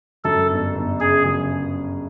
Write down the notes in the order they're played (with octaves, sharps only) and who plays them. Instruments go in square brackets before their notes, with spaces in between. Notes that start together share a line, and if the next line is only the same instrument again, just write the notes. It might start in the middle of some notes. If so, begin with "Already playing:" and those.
[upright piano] F#2 [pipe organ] A4
[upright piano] G1
G1
[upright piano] C#3 [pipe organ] G#4
[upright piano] F#2